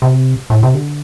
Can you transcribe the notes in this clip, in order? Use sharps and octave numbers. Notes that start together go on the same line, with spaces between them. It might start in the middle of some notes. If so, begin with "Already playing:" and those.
C3
A2
C3
D3